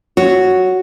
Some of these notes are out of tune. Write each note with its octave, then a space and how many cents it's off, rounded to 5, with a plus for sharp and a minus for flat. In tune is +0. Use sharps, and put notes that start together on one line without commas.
F#4 +0 C#5 +0